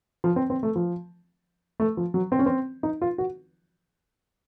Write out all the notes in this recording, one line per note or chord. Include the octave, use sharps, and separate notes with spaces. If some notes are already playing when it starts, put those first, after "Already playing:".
F3
C4
C4
A3
F3
A3
F3
F#3
C4
C#4
C4
D#4
F4
F#4